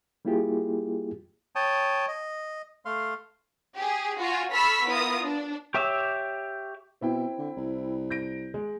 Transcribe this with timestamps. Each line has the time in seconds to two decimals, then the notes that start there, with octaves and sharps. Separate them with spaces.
0.25 G3 A#3 E4 F4 G4 G#4
1.55 C#5 G5 A5 D#6
2.08 D#5
2.85 A3 F5 C6
3.77 G4 G#4
4.20 F4 F#4 G#5
4.54 A4 B5 C#6 E6 F6 B6
4.86 B3 E4 F4 A#4 D#6
5.23 D4
5.74 G4 C#5 E5 D6 E6
7.01 B2 C4 E4 G5
7.38 D3
7.57 C2
8.10 G6 A#6 D7
8.54 G#3